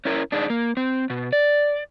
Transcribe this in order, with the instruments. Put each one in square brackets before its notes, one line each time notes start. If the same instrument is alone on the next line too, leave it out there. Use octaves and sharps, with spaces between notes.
[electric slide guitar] C#4 E4 A#4
D4 D#4 G#4
A#3
C4
B2
D5